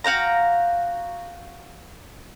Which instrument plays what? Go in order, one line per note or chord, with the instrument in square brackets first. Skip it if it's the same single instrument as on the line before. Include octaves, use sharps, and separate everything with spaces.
[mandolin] F#4 F5 G5 A#5